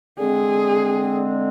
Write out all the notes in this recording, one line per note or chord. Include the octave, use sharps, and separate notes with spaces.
D3 G#3 C4 G#4